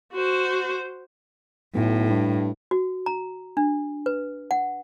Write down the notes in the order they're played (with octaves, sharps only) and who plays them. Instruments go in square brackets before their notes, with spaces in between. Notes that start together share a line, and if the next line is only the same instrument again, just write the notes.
[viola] F#4 C5
[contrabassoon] B1 [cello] A2
[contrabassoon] G2
[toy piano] F#4
A#5
D4
B4
F#5